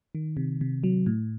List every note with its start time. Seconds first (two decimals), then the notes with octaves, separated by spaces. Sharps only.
0.15 D#3
0.37 C3
0.61 C3
0.84 F#3
1.06 A2